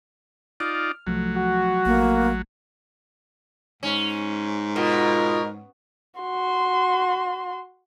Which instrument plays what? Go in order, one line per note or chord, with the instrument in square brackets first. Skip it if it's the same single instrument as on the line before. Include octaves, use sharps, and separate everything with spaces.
[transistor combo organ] D#4 F4 D5 [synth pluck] F6
[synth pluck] C2 F3 A3 [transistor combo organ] F#3
[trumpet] F#4
[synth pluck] A1 A3 [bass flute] A#3
[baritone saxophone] G#2 [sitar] C#4
[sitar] B2 [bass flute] F4 [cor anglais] A#4
[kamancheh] F#4 C6